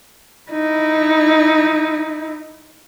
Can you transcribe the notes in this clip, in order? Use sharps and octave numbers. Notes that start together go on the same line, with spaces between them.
D#4 E4